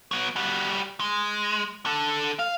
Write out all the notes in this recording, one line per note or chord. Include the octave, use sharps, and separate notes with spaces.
F#3 B3
G3 F#4
G#3
D4 A4
F5